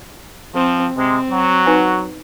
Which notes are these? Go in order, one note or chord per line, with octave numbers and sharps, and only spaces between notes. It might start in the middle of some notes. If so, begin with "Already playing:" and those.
F3 C4
C3 G#3 C4
F#3 F#4
D#4 B4 G#5